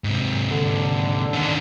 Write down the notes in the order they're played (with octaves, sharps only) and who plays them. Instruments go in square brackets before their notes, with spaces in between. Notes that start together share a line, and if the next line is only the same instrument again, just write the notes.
[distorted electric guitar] G#2 C3
[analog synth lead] D3
[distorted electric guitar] D#3 C#4